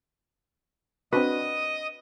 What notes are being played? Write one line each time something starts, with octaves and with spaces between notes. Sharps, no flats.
C4 D4 F#4 B4 D#5 D#6